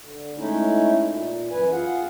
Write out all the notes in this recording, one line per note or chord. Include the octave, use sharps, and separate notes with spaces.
D3
G#3 A3 C#4 D#4 E4
A#2
F#2 E3 B4 G#5
F4 G#4 F#5